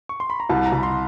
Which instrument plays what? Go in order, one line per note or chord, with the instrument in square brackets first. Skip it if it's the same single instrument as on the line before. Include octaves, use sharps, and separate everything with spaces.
[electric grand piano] C#6
C6
B5
A#5
[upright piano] C2 [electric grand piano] A5
[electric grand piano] A#5
[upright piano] C2 [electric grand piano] B5
[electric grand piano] C6